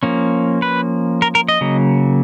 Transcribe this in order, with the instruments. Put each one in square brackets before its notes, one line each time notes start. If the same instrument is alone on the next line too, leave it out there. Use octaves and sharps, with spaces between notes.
[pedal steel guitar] F3 A#3 C#4
B4
A#4
A#4
D#5
C#3 F#3 A#3